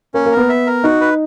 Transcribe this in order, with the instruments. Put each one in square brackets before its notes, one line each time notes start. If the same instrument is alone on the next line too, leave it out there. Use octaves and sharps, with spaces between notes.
[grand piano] A#3 [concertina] C#4
[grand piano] A#3
[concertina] A#4
[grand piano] B3
[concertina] E5
A#4
[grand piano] D#4 [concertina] F#4
[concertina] B4